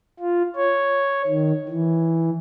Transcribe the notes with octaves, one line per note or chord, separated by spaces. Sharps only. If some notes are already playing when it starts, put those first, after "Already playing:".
F4
C#5
D#3
E3